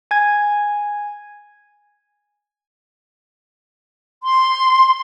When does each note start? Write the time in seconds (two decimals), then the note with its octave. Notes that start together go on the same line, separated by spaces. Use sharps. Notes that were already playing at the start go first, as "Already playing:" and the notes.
0.11 G#5 G#6
4.22 C6